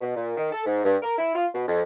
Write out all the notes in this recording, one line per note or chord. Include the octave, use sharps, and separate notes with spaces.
B2
A#2
D#3
A4
G#2
G2
A#4
E4
F4
B2
F2